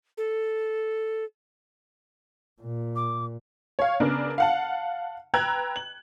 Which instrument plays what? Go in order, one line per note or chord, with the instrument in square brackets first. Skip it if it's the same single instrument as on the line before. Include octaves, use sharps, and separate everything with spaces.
[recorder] A4
[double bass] A#2
[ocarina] D6
[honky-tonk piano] C#5 F5
C#3 B3 D4 A#4
F5 F#5 A5
B4 G5 A#5 E6 F#6 G#6
F#7